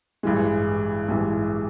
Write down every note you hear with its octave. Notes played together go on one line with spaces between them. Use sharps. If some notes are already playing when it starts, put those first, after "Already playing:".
A1 G2 E3 G#3
A1 G2 E3 G#3